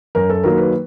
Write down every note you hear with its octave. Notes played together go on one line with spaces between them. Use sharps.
F#2 A#4
A4
D#3 F#3 A#3 A#4
B4